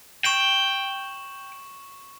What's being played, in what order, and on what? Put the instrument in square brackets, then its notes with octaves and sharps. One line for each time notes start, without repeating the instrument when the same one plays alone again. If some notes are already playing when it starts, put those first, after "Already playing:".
[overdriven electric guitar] G5 [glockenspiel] C#6 E7 F#7